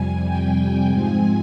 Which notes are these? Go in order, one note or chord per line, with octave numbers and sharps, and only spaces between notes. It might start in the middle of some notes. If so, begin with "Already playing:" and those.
Already playing: F2 C3 G3 G#5
G5
G#2 F3 G#3 C4 G#5